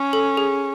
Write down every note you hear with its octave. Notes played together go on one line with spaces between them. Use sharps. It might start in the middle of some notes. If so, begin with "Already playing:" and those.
Already playing: C#4
A4
G#4